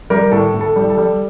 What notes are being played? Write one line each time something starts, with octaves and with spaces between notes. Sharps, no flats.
G3 G4 A#4
A2 A4
A2
A4
G3
A4
G3